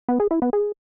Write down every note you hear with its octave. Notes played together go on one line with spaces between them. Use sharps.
B3
G#4
E4
B3
G#4